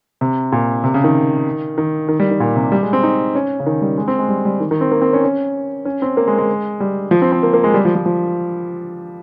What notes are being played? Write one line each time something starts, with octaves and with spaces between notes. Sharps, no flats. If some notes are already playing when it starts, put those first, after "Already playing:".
C3
A#2
C3
C#3
D#3
D#3
D#3
G3
D#3
A#2
C3
G3
G#3
C4
D#4
C#4
C#3
D#3
G3
G#3
C4
G#3
G3
G3
D#3
D#3
C4
A#3
C4
C#4
C#4
C#4
C4
A#3
G#3
G#3
G3
F3
C4
C4
A#3
A#3
G#3
G3
F3
F3
F3